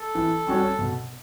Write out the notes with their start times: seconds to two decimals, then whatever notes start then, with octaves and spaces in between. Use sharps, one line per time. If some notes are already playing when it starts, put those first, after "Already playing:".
Already playing: A4
0.15 E3
0.47 G3 C#4 F#4 C#5
0.79 B2